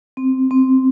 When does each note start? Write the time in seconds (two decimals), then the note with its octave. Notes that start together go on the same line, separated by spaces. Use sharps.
0.17 C4
0.51 C4